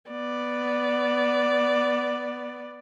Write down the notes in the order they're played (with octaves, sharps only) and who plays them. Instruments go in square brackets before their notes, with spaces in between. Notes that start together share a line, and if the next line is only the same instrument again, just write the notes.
[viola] B3 D5